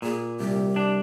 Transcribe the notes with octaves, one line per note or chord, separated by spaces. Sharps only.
A#2 G#4
C2 G4
D4